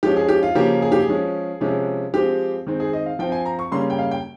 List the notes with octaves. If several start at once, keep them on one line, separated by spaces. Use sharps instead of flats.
F3 G#3 C#4 G4
G#4
G4
F4
C#3 F3 A#3 C#4 G4
G#4
G4
G#4
F3 G#3 C#4
C3 F3 G#3 C#4
F3 G#3 C4 G4
D#3 G#3 C4
G#4
D#5
F5
F3 C4 G5
G#5
A#5
C#6
C#3 G3 A#3 C#4 C6
G5
F5
G5